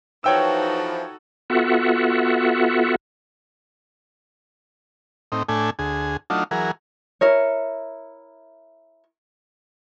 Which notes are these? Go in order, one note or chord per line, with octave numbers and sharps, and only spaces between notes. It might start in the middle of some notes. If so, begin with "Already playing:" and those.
E3 F3 D#4 F#4 A4 C#5 G5 E6
B3 F4 F#4 A4 E5 F#5
A2 C4 D#4
A2 A3 D4 G#5
D2 G#4
F#3 A3 D4 D#4 F4
E3 F#3 G#4 A#4
E4 A#4 C#5